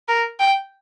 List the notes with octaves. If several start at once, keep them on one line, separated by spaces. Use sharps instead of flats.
A#4
G5